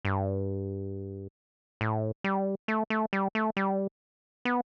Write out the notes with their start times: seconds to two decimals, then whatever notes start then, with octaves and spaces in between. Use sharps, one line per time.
0.05 G2
1.81 A2
2.24 G3
2.68 A3
2.90 A3
3.13 G3
3.35 A3
3.57 G3
4.45 B3